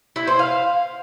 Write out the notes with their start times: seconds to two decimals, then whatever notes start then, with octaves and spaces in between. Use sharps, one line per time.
0.16 E4
0.27 C5
0.39 F5